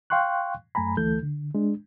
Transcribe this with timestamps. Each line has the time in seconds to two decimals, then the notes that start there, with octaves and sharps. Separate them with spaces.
0.10 F5 G5 C6 C#6 F#6
0.75 F#2 A3 G#5 A#5 B5
0.97 D2 E3 A3 A4 G6
1.23 D3
1.55 G#3 D4